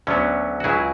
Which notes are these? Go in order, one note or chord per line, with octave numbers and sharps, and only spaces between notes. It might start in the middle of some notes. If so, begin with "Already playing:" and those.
D2 D3 F#3 B3 C#4
F#4
C#2 C#3 F#3 E4 G#4